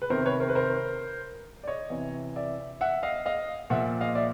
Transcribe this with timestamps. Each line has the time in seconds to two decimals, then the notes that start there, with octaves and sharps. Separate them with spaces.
0.02 B4
0.10 C3 D#3 A#4 C5
0.25 B4 C#5
0.40 A#4 C5
0.49 B4
0.55 A#4 C5
1.63 D5
1.67 C#5 D#5
1.90 C3 E3
2.36 D5 E5
2.81 E5 F#5
3.03 D#5 F5
3.26 D#5 F5
3.70 A#2 F3 E5 F#5
4.01 D#5 F5
4.15 D5 E5